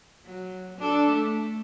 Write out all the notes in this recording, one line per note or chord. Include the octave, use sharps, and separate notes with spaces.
F#3
D4 A4
A3